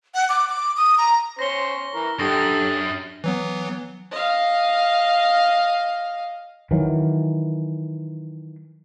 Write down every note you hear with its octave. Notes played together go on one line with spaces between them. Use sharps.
F#5
D6
D6
D#6
A#5
C#4 C5 C6 A#6 G7
C#6
E3 A#4
F#2 D4 G4 A4 D#6 A6 A#6
E3 F#3 B3
D#5 F5
D#3 E3 F#3